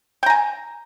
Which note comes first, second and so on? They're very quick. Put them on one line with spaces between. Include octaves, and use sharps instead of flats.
G5 A#5 G#5